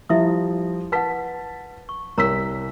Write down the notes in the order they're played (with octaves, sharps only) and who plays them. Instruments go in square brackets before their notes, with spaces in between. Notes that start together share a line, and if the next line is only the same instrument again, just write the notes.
[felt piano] F3 G3 [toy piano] E4 E5 D#6
[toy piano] B4 F#5 [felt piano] A5 B6
[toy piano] C#6
[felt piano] C2 E6 B6 [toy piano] A#4 C#5 A#5